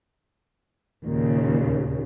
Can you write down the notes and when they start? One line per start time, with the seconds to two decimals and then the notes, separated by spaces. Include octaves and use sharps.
1.05 D#2 A#2 C#3